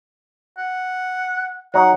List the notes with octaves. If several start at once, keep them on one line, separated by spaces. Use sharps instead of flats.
F#5
F#3 D#4 D#5 F#5